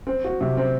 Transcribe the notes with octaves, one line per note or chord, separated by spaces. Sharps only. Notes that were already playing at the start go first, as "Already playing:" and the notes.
C4
F#4
C3
C4